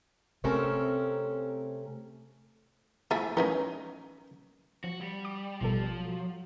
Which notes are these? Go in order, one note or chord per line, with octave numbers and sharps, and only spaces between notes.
C3 A3 C4 C#4 A4 A#4
F3 A3 E4 G#5
E3 C#4 D#4 A#4
F3 F#4
G3
D6
A1 B2 F3 G3 A4
F#3